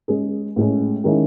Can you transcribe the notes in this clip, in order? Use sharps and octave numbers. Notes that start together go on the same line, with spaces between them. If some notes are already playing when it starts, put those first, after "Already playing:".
G#3 C#4 G#4
A2 G#3 C#4
D#3 G#3 C#4 E4